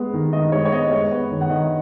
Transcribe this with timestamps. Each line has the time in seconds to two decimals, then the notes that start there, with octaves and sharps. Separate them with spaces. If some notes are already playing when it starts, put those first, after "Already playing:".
Already playing: G#3 B3
0.14 D#3
0.33 D#3 D#5
0.52 G#3 C#5
0.65 C#5
0.72 B3 D#5
0.91 G#3 C#5
1.11 B3
1.31 D#3
1.41 F#5
1.50 D#3 D#5